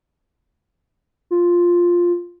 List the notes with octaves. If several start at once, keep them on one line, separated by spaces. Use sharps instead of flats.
F4